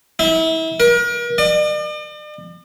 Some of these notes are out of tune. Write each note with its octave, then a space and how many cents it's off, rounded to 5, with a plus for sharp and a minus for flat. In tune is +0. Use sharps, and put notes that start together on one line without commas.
E4 -35
A#4 +40
D5 +45